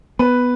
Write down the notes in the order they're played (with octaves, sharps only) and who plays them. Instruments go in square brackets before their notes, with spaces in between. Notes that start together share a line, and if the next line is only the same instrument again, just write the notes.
[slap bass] B3 [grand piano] B4